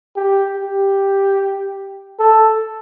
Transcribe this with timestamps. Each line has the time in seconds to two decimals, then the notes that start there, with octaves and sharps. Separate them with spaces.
0.16 G4
0.57 G4
2.19 A4